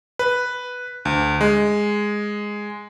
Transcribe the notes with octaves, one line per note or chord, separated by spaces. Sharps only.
B4
D2
G#3